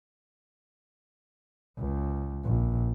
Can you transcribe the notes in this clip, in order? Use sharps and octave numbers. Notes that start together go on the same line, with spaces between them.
C#2
A#1